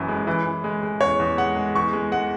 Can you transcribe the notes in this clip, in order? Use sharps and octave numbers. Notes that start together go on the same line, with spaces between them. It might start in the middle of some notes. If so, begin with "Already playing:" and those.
Already playing: F#1 F#2 E3
G#3
E3
E3
G#3
G#3
E2 C#5
E2
G#3 F#5
G#3
E2 C#6
G#3
G#3 F#5